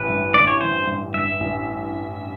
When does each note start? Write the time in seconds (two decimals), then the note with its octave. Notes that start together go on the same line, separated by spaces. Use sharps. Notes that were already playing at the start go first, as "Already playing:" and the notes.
Already playing: A1 E3 B4
0.09 G2
0.34 A1 D5
0.47 C#5
0.61 E3 C5
0.87 G2
1.14 G2 E5
1.40 A1